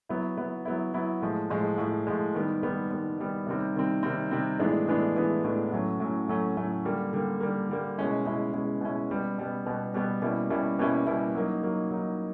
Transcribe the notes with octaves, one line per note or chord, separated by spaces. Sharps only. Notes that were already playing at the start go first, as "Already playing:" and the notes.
F#3 B3 E4
F#3 B3 E4
F#3 B3 E4
F#3 B3 E4
A2 F3 G#3
A2 F3 G#3
A2 F3 G#3
A2 F3 G#3
D#3 G3 B3
D#3 G3 B3
D#3 G3 B3
D#3 G3 B3
C3 D#3 G3 C4
C3 D#3 G3 C4
C3 D#3 G3 C4
C3 D#3 G3 C4
A2 E3 G#3 B3 D4
A2 E3 G#3 B3 D4
A2 E3 G#3 B3 D4
A2 E3 G#3 B3 D4
A2 F#3 A3 C#4
A2 F#3 A3 C#4
A2 F#3 A3 C#4
A2 F#3 A3 C#4
D3 G3 A#3
D3 G3 A#3
D3 G3 A#3
D3 G3 A#3
B2 G#3 C#4 E4
B2 G#3 C#4 E4
B2 G#3 C#4 E4
B2 G#3 C#4 E4
B2 G3 B3
B2 G3 B3
B2 G3 B3
B2 G3 B3
B2 G3 A#3 C#4 E4
B2 G3 A#3 C#4 E4
B2 G3 A#3 C#4 E4
B2 G3 A#3 C#4 E4
F#3 A#3 D#4
F#3 A#3 D#4
F#3 A#3 D#4